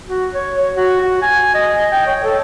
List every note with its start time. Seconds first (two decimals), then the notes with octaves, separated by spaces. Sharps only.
0.07 F#4
0.33 C#5
0.57 C#5
0.75 F#4
1.01 F#4
1.22 G#5
1.54 D#5
1.92 G5
2.07 C#5
2.24 A4